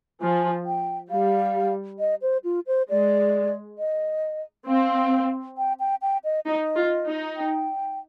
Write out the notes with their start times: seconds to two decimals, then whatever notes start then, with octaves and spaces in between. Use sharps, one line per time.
0.21 F3 G#5
0.66 G5
1.10 G3 F5
1.99 D#5
2.22 C5
2.44 F4
2.67 C5
2.90 G#3 D5
3.78 D#5
4.67 C4 F5
5.58 G5
5.80 G5
6.02 G5
6.24 D#5
6.46 D#4 D#5
6.76 F4
7.06 D#4
7.36 G5